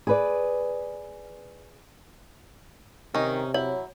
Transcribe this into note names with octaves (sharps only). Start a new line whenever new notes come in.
G#4 B4 D5
C3 D#3 C#4 D#4
F#3 E4 C#5